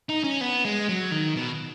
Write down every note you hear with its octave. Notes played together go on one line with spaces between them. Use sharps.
D#4
C#4
B3
G#3
F#3
D#3
B2